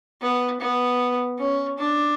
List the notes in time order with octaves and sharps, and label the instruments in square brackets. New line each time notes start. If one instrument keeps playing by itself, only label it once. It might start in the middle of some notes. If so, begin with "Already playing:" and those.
[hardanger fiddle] B3
B3
C#4
D4